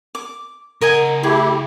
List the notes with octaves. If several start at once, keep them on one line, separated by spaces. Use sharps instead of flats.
D6
C#3 A#4 D#5 F#5 G#5
A3 E4 G4 G#4